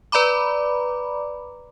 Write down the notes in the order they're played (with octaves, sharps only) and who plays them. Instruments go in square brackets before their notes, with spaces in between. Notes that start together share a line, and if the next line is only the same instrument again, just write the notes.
[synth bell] B4 D5 A#5 B5 D6